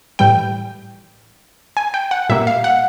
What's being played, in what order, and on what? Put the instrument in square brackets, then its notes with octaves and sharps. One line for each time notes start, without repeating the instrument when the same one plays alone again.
[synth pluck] A2 E3 G3 G5
G#5
G5
F#5
A#2 G3 A#3 E5
F5
F#5